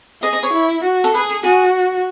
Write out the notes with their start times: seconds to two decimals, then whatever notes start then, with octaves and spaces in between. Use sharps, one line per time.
0.22 G#4 D#5
0.33 D#5
0.43 C#5
0.53 E4
0.84 F#4
1.04 A4
1.14 G#4 B4
1.30 A4
1.44 F#4 G#4